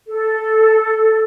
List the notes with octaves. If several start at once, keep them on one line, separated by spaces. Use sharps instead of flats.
A4